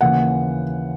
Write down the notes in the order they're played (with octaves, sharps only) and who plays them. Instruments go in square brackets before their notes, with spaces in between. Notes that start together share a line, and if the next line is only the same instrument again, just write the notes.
[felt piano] D#2 C#3 E3 F#5